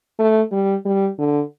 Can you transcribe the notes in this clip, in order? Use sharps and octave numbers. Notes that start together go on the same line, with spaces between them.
A3
G3
G3
D3